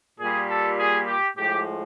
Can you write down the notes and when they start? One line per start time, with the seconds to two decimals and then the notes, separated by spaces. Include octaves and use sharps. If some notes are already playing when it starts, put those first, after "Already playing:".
0.20 A#2 G3 G#4
0.49 A4
0.79 G#4
1.07 G4
1.37 A2 F3 G#3 G4